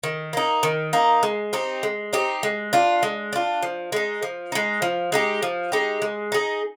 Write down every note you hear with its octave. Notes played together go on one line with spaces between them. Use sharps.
D#3
A#3 D#4
D#3
A#3 D#4
G#3
C4 D#4 G4
G#3
C4 D#4 G4
G#3
D4 F4
G#3
D4 F4
F3
G#3 D#4
F3
G#3 D#4
F3
G#3 D#4 G4
F3
G#3 D#4 G4
G#3
D#4 G#4